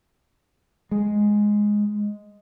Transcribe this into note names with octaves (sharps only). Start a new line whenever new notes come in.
G#3